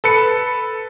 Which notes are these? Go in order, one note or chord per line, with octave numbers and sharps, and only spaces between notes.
A4 B4 C#7